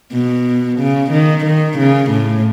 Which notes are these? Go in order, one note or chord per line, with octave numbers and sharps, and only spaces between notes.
B2
C#3
D#3
D#3
C#3
A2